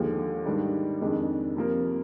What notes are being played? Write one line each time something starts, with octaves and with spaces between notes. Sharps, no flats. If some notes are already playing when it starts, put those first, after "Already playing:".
Already playing: D#2 D3 F3 G#3
G#2 D#3 G3 D4
F2 D#3 G#3 D4
C3 F3 A#3